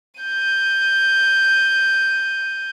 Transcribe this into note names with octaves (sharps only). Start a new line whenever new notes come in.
G6 D#7